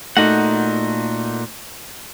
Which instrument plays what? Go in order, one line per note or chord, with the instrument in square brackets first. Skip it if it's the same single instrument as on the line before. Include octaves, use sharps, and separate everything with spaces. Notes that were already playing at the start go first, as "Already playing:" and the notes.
[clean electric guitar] A#2 F#4 F#5 [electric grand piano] A3 D#4